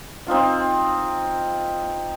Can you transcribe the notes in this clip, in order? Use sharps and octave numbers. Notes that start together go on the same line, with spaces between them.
C4 D#4 F4 A5